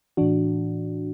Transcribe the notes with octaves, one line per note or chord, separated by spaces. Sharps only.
A2 E3 D4 F#4